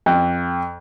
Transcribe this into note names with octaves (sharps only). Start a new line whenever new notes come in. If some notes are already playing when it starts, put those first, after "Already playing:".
F2